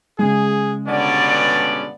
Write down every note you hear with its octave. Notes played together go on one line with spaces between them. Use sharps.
C#3 G#3 G#4
G2 B2 D3 B3 C#4 D5